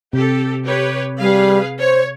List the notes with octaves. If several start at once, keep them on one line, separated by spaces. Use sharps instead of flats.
C3 G4 A4
G4 B4 C#5
G3 G#4 B4 F5
C5 C#5